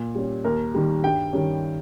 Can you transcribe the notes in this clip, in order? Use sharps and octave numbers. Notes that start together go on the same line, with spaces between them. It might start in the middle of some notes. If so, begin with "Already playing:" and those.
Already playing: A#2
G3 C#4
D#2 A#4
D#3 G3
G2 G5
D#3 G3 C#4